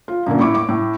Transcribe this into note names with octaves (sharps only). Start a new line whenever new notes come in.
F4
F#2 A#2 D3 A#3
A2 E4 C#6 D6
D6
A2